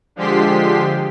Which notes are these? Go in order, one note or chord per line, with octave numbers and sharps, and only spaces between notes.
D3 F3 G#3 G4 C6 B6